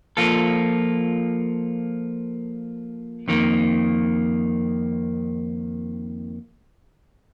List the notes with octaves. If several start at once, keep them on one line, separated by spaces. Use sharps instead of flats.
F3 A#3 F4 A4
F2 D#3 A#3